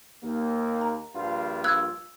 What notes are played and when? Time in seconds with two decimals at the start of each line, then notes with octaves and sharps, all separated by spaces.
0.23 D#2 A#3
0.81 A#5
1.15 A#1 G2 F4
1.64 E6 F#6 G#6